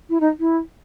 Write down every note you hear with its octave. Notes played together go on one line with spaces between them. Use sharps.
E4
D#4
E4